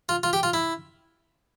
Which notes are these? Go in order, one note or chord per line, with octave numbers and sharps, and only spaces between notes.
F4
F4
G4
F4
E4